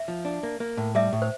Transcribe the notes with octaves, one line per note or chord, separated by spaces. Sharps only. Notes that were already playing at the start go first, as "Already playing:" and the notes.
Already playing: E5
F3
D4
A#3
A#3
A2
G3 E5
A2
C5